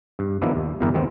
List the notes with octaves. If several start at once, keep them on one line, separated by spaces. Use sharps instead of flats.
G2
D#3 F3 A#3 B3 D4 E4
D#2
G1 E2 G2 E4 G4 A#4
D#2 D#3 G#3 B3 C4